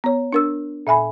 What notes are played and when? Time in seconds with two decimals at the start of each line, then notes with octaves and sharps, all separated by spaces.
0.04 B3 C#5
0.33 D4 A#4 E6
0.87 A#2 E5 G#5 B5